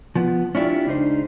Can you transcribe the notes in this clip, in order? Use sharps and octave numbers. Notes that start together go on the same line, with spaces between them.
F3 B3
C#4 D4 E4 F4 G4
C#2 D4 D#4 C5